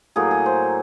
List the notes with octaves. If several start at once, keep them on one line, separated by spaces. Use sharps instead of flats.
A2 F#3 A#3 G#4
G#4
C5